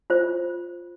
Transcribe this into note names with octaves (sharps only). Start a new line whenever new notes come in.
F4 C5